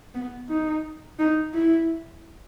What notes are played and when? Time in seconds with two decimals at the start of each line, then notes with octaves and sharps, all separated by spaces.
0.14 B3
0.49 D#4
1.19 D#4
1.54 E4